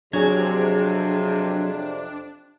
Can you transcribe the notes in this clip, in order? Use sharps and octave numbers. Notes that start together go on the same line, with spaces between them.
F2 C3 F#3 D4 G#4 C#5 G#6